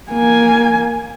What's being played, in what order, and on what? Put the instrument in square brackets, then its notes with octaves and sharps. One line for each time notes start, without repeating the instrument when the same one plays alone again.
[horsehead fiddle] A#3 G#5